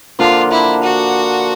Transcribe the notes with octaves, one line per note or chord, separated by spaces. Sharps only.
D3 F3 A#3 D4 F4
E4
F#4